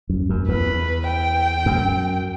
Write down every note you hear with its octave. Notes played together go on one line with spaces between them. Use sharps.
F#2
F#2
E2 B4
G5
F#2